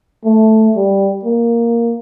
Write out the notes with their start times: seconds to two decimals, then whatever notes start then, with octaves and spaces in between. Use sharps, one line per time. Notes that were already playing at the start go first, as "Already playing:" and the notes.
0.25 A3
0.76 G3
1.24 A#3